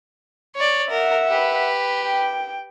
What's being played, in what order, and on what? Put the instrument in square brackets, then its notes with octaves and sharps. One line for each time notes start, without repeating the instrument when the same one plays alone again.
[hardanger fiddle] C#5 D5
[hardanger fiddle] A#4 [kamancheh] E5 F#5
[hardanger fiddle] G4 B4
[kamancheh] G5